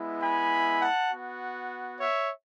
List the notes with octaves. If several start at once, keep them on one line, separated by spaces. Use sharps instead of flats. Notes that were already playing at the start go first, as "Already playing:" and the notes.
Already playing: G#3 B3 E4
G#5 B5
F#5 A5
B3 F#4
C#5 E5